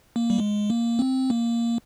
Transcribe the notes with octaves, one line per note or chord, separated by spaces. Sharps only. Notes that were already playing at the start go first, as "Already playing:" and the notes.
A#3
G3
G#3
A#3
C4
A#3